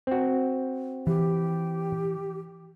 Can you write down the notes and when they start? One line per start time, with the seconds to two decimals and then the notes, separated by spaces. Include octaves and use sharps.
0.07 C4 F#4
1.07 E3 G4